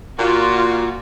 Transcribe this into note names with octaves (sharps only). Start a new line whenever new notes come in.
A#2 F4 F#4